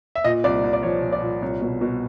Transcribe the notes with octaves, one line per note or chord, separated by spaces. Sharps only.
E5
A#2 D#5
C2 D5
C2
D5
F3 C#5
A#2
D5
A#2
C2 C#5
B2
B2